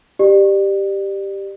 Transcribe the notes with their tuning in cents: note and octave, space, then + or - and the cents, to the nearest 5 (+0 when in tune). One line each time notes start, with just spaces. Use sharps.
G4 +0 D5 +30